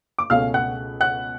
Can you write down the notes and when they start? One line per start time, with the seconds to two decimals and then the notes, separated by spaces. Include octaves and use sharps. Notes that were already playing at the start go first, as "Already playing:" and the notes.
0.19 D6
0.30 C#2 B2 A3 C#4 F5 F6
0.54 F#5 F#6
1.01 F#5 F#6